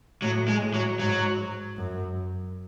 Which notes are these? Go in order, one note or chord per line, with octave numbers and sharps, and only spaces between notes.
A2 F#3
G#3
A2
F#3
G#2 F#3
F#2